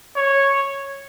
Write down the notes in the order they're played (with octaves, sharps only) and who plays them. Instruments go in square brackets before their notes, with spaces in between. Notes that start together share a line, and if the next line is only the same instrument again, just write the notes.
[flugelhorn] C#5